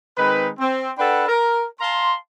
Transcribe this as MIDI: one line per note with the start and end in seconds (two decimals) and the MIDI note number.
0.18 0.49 51
0.18 0.49 56
0.18 0.49 60
0.18 0.49 63
0.18 0.49 71
0.59 0.91 60
0.98 1.27 62
0.98 1.27 69
0.98 1.27 71
0.98 1.27 78
0.98 1.27 79
0.98 1.27 83
1.29 1.63 70
1.81 2.15 77
1.81 2.15 81
1.81 2.15 82
1.81 2.15 84